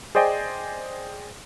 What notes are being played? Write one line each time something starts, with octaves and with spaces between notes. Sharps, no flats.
G#4 C5 D5 D#5 G5 G#5